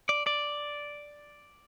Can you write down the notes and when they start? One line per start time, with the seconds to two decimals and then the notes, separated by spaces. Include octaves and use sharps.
0.09 D5
0.27 D5